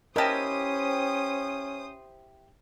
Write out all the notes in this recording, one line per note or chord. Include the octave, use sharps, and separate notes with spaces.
C#4 E4 G4 A#4 C5 D#5 A5 D#6